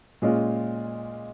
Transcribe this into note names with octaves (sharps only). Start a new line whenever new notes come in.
A#2 G#3 C#4 F4